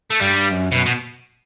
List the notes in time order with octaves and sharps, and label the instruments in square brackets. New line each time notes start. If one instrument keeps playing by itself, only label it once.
[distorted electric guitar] A3
[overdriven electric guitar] G2 [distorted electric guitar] G3
[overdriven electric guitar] F#2
[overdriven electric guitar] F#2 [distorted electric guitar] B2
[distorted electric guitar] B2